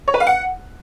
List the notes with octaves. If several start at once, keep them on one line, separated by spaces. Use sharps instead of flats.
C#5
B4
F5
F#5